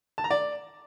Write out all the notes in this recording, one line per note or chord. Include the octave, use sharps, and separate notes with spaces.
A5
A#5
D5